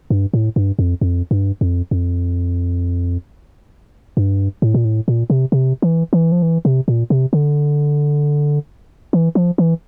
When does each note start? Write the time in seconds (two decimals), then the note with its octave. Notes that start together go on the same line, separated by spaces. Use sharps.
0.10 G2
0.34 A2
0.56 G2
0.79 F2
1.01 F2
1.31 G2
1.61 F2
1.91 F2
4.17 G2
4.62 A2
4.74 A#2
4.85 A2
5.08 A#2
5.30 C3
5.52 C3
5.82 E3
6.13 E3
6.32 F3
6.42 E3
6.65 C3
6.88 A#2
7.10 C3
7.33 D3
9.13 E3
9.35 F3
9.58 E3